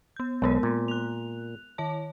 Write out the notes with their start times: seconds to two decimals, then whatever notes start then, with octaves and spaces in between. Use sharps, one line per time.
0.16 B3 G6
0.42 B1 G#3 B3 A#4
0.63 A#2
0.88 F#6 F7
1.78 D#3 C#5 A5